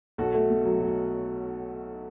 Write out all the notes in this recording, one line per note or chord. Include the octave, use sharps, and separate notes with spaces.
B1 F#4 A4
A3
B2
F#3
F#3